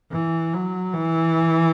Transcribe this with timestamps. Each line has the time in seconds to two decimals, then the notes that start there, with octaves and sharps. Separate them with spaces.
0.12 E3
0.53 F#3
0.93 E3